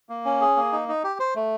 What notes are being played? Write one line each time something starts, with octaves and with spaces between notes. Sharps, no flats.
A#3
C#4
G#4
A#3
D#4
D#4
G4
C5
A3